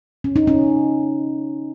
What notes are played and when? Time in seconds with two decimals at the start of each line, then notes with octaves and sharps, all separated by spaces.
0.24 C#4
0.36 D#4
0.47 C#4